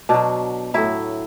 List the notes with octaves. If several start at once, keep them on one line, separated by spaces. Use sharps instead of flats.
B2 F#3 D4
A2 F#3 E4